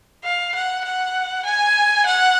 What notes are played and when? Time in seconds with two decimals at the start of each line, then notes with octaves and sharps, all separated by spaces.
0.24 F5
0.55 F#5
0.84 F#5
1.45 G#5
2.06 F#5